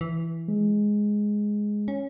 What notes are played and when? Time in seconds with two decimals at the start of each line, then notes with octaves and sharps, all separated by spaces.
0.01 E3
0.48 G#3
1.88 C#4